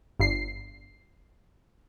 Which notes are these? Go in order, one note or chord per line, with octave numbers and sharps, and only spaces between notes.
G1 C7